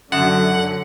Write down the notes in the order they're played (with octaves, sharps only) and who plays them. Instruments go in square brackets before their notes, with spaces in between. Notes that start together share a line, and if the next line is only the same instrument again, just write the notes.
[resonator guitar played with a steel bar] F#2 [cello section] D3 F#3 [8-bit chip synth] F#5